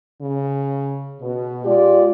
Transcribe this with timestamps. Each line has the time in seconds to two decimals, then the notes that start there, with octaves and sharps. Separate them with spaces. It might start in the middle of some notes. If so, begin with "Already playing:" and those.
0.22 C#3
1.22 B2
1.65 G#3 F4 G4 D5